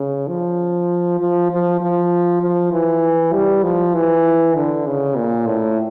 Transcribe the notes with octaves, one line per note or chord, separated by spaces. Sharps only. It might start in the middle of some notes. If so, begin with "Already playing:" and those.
Already playing: C#3
F3
F3
F3
F3
F3
E3
G3
F3
E3
D3
C#3
A#2
A2